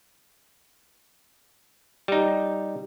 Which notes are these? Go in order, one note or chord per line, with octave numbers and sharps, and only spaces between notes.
G3 D#4